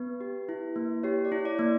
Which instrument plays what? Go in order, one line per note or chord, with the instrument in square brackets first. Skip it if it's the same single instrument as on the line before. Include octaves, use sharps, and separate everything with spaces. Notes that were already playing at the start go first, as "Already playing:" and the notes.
Already playing: [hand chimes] B3 B4
G4
E4
A#3
G4 C#5
D5
E4
D5
A#3